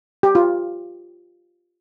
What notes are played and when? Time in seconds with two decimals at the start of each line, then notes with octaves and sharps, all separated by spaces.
0.23 G4
0.35 F4